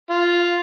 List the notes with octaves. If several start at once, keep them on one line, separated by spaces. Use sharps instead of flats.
F4